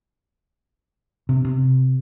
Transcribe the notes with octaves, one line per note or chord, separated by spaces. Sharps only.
C3
C3